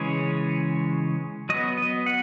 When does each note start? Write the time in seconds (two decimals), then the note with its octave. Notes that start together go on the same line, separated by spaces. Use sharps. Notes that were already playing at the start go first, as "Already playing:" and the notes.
Already playing: C#3 E3 G#3 C#4 C#5
1.49 F#3 B3 D#5
1.78 D#5
2.06 F#5